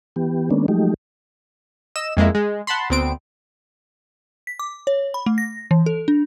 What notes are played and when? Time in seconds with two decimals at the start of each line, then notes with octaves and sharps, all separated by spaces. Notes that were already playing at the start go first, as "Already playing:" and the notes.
0.16 E3 B3 G4
0.51 D#3 G#3 A#3 B3 C#4 D4
0.68 F3 F#3 G#3 A3 D#4 G4
1.96 D#5 E6 E7
2.17 F2 G#3 A#3 E4
2.35 G#3
2.67 F#5 A5 B5 C6
2.90 D2 B3 C4 D7
4.47 B6
4.59 D6
4.87 C#5
5.14 B5
5.26 A3
5.38 A#6
5.71 E3
5.86 A4
6.08 D4